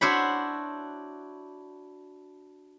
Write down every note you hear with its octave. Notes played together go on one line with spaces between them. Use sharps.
D4 E4 F#4 C5 C#5 B5